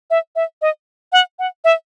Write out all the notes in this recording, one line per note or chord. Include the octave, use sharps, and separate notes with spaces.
E5
E5
D#5
F#5
F#5
E5